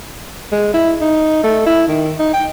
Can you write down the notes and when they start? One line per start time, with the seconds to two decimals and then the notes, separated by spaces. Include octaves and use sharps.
0.52 G#3
0.73 E4
1.01 D#4
1.44 A3
1.66 E4
1.87 D#3
2.19 D#4
2.33 G5